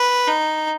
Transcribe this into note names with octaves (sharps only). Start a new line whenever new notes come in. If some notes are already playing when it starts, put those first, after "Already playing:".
Already playing: B4
D#4